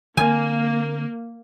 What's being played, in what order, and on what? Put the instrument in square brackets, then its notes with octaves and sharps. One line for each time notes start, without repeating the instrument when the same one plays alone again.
[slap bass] D3 C4 [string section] A#3 [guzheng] G#5